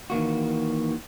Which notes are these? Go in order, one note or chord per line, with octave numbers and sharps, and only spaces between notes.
D#3 E3 A#3 F#4